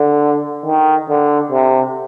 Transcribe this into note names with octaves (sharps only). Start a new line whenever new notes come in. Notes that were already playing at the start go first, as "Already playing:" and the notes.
Already playing: D3
D#3
D3
C3